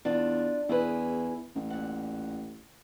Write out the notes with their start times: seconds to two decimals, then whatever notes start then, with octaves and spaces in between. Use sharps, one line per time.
0.05 E2 D4 F4
0.69 E2 E4 G#4 B4
1.56 A1
1.70 A#2 F#5